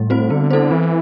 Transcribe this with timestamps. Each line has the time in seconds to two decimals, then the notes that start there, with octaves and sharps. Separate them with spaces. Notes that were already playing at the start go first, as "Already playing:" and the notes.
Already playing: A2 G3
0.10 C4 F#4 C5
0.30 D3 B3
0.51 E4 A4 C5
0.71 E3 C4